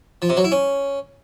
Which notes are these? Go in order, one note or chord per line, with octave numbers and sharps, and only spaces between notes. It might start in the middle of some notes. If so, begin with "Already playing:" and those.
F3
C3
F#3
E4
C#4